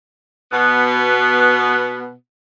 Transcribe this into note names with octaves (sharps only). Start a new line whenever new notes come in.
B2 B3